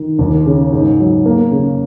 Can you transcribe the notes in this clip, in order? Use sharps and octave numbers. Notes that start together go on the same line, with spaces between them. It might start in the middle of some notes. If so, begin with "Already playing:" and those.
Already playing: D#3
D#2
C#3
G#2
F#3
A#3
C#3